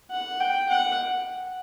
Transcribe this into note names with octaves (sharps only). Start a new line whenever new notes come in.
F#5
G5
F#5